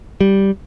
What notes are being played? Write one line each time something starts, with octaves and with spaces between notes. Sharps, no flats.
G3